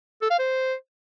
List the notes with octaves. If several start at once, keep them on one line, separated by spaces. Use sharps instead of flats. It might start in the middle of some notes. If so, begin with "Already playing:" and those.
A4
F5
C5